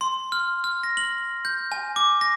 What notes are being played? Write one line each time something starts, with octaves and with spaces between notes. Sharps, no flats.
C6
F6
F6
A#6
F#7
G6
G#5
D6
A#6